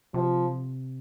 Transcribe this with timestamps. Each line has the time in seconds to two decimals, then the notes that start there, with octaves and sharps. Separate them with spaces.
0.14 C3 F3